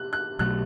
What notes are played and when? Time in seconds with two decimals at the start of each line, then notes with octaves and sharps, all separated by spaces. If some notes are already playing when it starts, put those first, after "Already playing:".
Already playing: F#6
0.13 F#6
0.39 B1 B2 F#3 A3 F#6